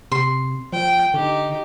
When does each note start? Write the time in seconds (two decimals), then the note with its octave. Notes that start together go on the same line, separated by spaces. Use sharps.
0.12 C3 C6
0.73 F3 G5
1.14 D3 D#4 G4